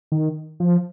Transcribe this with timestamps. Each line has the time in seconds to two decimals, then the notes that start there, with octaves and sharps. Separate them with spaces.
0.12 D#3
0.60 F3